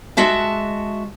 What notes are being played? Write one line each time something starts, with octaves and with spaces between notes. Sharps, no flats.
G#3 F#4 E5 A5